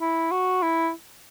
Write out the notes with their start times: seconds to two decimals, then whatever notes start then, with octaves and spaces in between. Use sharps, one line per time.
0.01 E4
0.31 F#4
0.62 E4